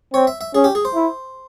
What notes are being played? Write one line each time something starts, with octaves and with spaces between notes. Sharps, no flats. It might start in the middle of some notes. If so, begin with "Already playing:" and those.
C4 C#5
E5
E5
C#4 G#4
G4
G#4
C5
E4